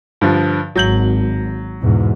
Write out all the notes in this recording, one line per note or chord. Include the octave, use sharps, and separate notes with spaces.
G2 D3 F3
G#1 F#3 G6 F#7
E2 G#2 B2